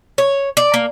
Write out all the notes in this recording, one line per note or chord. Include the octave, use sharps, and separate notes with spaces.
C#5
D5
A#3